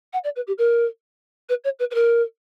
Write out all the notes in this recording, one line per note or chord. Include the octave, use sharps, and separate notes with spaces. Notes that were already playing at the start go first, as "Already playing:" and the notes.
F#5
D5
B4
G4
A#4
B4
C#5
B4
B4
A#4